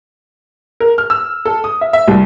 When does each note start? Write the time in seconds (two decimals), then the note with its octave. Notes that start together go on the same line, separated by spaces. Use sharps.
0.80 A#4
0.98 F6
1.10 E6
1.45 A4
1.64 D#6
1.81 E5
1.93 E5
2.08 C2